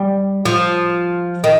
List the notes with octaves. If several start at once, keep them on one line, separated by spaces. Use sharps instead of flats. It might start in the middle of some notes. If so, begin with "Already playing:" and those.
Already playing: G3
F3
D#3